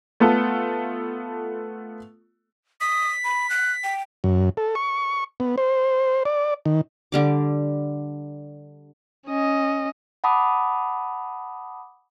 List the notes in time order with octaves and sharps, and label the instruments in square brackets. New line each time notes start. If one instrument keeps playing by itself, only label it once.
[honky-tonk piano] A3 B3 F4 A4
[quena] D#6 [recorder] B6
[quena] B5
F#6
G5
[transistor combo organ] F#2
A4
C#6
B3
C5
D5
D#3
[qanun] D3 G3 D6
[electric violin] C#4 D#5
[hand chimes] F#5 A5 B5 D6 D#6